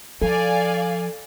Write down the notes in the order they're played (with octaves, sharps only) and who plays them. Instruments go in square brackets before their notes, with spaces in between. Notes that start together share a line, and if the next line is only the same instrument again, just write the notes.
[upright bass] F3 [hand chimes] A4 [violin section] D5 F5 G#5